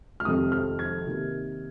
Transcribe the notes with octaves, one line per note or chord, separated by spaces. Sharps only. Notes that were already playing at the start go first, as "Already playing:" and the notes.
F6
F2 C3 D#3 C4 D#4 D#6
F6
G#6
C3 D#3 A#3